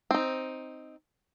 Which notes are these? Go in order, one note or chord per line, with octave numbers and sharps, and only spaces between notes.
C4 D#4